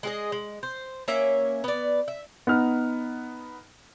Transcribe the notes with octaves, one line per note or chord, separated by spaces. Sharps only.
G#3 G#4 D#5
G#3
C5
A#3 C#4 C#5 E5
B3 D5
E5
B3 D#4 F6